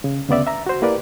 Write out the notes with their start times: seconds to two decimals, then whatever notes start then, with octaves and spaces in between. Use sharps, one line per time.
0.04 C#3
0.29 D2 C#3 B3 D5 E5
0.47 E5 A#5
0.66 F#4 C5
0.82 A#3 E4 G4 A#4 B4 D5